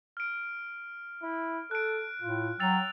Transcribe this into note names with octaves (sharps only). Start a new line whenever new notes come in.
F6 D7
E4
A4 F#6 D7
A2 F4
F#3 G5 E6 A6 F7